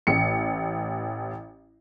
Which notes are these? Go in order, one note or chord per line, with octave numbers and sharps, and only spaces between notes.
A1 C#7